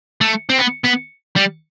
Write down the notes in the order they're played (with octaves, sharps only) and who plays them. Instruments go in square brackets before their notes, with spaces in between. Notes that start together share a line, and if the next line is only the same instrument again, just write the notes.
[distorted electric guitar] A3
C4
B3
B3
G3